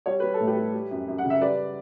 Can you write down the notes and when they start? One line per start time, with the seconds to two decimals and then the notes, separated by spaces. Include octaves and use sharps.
0.06 G3 C#5
0.20 G3 B4
0.34 A4
0.40 A2
0.47 G4 B4
0.57 G3
0.74 G3
0.91 F#2
1.08 F#2
1.18 F#5
1.24 C#3
1.30 E5
1.41 G3 B4 D5